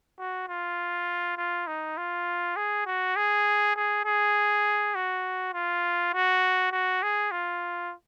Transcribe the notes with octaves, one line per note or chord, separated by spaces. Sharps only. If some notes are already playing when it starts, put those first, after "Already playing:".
F#4
F4
F4
D#4
F4
G#4
F#4
G#4
G#4
G#4
F#4
F4
F#4
F#4
G#4
F4